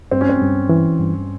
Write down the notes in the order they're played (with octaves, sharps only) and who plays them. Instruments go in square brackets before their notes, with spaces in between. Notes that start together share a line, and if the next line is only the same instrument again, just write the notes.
[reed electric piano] G2 [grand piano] C4
[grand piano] C#4
C4
[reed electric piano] G2
E3
G2